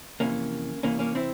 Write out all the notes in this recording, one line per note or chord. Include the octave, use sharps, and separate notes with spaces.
F2 C3 E3 A#3 C#4
C2 C3 E3 A#3 C#4
A#3 C#4
C4 E4